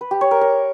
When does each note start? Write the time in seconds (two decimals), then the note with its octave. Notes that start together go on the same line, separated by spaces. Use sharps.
0.01 B4
0.11 G4
0.21 C#5
0.31 A#4
0.41 A#4